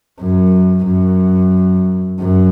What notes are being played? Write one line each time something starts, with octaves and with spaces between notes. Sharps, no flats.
F#2
F#2
F#2